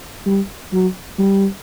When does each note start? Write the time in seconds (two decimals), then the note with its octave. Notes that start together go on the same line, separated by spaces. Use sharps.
0.26 G3
0.73 F#3
1.19 G3